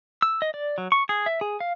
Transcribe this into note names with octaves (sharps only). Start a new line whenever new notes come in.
E6
D#5
D5
F#3
C#6
G#4
E5
G#4
F5